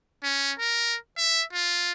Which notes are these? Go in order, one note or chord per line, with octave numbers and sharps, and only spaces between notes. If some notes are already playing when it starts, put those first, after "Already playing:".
C#4
A#4
E5
F4